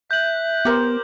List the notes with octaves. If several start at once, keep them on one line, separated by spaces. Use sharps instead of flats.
E5 F#6 G6 F#7
B3 G4 A#4 C5